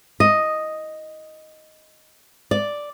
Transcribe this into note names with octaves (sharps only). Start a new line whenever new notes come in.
D#5
D5